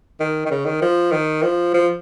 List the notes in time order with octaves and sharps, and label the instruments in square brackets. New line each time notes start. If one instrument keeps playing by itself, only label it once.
[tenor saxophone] D#3
D#3
C#3
D#3
F3
D#3
F3
F3